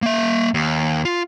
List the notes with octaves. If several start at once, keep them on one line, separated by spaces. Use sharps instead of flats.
A#3 E5
D#2
F4